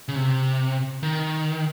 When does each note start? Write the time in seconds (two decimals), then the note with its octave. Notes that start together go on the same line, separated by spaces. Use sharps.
0.08 C#3
0.16 C3
1.03 D#3